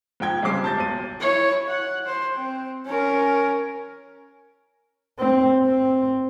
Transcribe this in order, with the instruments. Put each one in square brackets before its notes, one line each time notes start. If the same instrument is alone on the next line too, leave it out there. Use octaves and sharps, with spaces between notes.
[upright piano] G#2 F3 G5 G#6
G2 C#3 G#3 C4 D6 C7
A5 G6 A6
B1 D#7
[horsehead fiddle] E4 C#5
F#5
C5
C4
C#4 A#4
[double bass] C4
C4